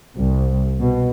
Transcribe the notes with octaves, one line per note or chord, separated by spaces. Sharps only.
C2
B2